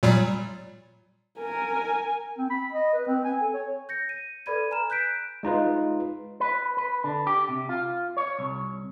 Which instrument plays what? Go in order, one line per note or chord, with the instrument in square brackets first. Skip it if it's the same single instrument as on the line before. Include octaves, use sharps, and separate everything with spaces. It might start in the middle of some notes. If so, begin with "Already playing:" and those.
[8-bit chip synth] A#2 F#3 G3
[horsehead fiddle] A#4 [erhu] G#5
[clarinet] C4
B5
D#5
B4
C4
G#5
A4
C#5
[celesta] G6 A#6 C#7
D#7
A4 B4 D5 B5 G#6 D#7
G#5 A#5 F6 E7
F#6 G6 B6 D7
[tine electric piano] G#3 D#4 F4 B4
[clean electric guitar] B4
B4
D3
G4
C3
F4
C#5
C2